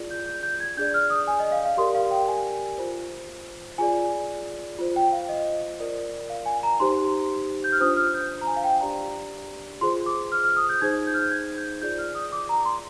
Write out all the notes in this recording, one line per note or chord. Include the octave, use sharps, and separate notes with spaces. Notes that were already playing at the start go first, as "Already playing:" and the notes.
Already playing: F4 G#4 D5
G6
G6
G6
G#6
D4 G#4 D5 G6
F6
D#6
G#5
D#5
F5
F5
G4 A#4 D5 C6
F5
G5
G#5
F4 C5
F4 G#4 D5 G#5
F4 C5
G5
F5
D#5
F4 A#4 D5
F5
G#5
A#5
D#4 G4 C5 C6
G6
F6
D4 F4 C5 D#6
F6
G6
A#5
G#5
F5
G5
D4 G4 D5 A#5
F4 G#4 C5 C6
D6
F6
F6
D#6
G6
D#4 G#4 C5 G#6
G6
F6
G6
G#6
G6
F4 G#4 D5 G6
F6
D#6
D6
A#5
C6